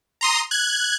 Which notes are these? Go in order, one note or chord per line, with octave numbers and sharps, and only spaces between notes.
A#5 C6 D#6
F#6 G#6